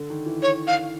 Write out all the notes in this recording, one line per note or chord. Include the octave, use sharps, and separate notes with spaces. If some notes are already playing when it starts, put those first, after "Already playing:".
Already playing: D3
D#3
E3
C#5
F5